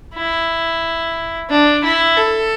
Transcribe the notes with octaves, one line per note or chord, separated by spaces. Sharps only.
E4
D4
E4
A4